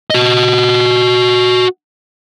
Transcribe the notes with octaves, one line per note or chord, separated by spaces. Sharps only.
F#4 D#5